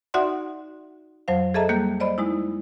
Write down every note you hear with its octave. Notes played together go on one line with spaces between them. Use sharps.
D#4 F#4 D5 E5 F#5 C6
F2 F#3 C5 F5
G#4 A4 D#5 E5 A5 A#5
G3 A#3 F#6 G6
C5 D5 D#5 B5
G#3 D#4 E4